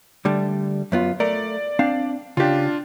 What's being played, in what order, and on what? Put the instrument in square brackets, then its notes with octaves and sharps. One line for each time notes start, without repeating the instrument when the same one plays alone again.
[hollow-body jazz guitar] D3 G3 A3
F#2 B3 F4
[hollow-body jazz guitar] A3 A#4 [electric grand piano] D5
[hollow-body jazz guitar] C4 D4 F5
[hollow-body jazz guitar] C#3 G4 [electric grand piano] D4 F4